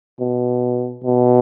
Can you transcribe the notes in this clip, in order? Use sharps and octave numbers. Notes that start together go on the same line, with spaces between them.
B2
B2